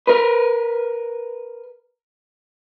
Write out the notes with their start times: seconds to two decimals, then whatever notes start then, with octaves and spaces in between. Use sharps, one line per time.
0.07 A#4 B4